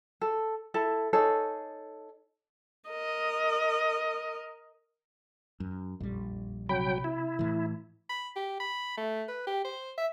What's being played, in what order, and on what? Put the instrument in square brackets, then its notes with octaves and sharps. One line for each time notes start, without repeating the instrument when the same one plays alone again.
[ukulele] A4
E4 A4 A5
D#4 G#4 A4 C#5
[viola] A#4 D#5
[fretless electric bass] F#2
[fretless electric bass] A#1 G3 [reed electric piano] F2
[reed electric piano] C3 B5 [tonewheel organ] F#3 G5
[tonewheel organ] E4
[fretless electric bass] A2 E3
[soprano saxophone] B5
G4
B5
A3
B4
G4
C5
E5